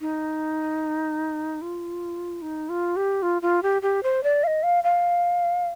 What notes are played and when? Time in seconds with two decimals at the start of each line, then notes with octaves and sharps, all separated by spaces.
0.01 D#4
1.62 F4
2.42 D#4
2.69 F4
2.96 G4
3.22 F4
3.42 F4
3.63 G4
3.82 G4
4.03 C5
4.23 D5
4.44 F5
4.47 D#5
4.63 F5
4.84 F5